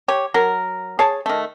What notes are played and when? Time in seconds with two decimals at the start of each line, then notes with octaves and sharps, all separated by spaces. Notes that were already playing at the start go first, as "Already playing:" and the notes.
0.08 G4 C#5
0.34 F#3 A#4
0.99 G#4 C#5 A5
1.26 D#3 A3